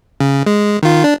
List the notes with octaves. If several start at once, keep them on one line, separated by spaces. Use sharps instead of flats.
C#3
G#3
D#3 F4
D4